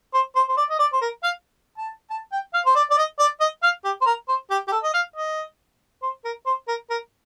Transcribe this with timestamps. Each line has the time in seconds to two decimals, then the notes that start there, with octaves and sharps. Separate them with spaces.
0.14 C5
0.36 C5
0.49 C5
0.57 D5
0.70 D#5
0.79 D5
0.93 C5
1.01 A#4
1.23 F5
1.78 A5
2.10 A5
2.32 G5
2.54 F5
2.66 C5
2.76 D5
2.91 D5
2.98 D#5
3.19 D5
3.41 D#5
3.63 F5
3.84 G4
4.01 C5
4.06 A#4
4.29 C5
4.50 G4
4.68 G4
4.72 A4
4.83 D#5
4.94 F5
5.16 D#5
6.02 C5
6.25 A#4
6.46 C5
6.68 A#4
6.90 A#4